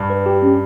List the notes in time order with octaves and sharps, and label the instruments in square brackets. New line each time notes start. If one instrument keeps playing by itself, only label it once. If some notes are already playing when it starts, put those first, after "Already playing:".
Already playing: [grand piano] G2
[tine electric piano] B4
G4
C#4